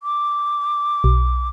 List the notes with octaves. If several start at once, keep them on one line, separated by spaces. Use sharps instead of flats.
D6
B1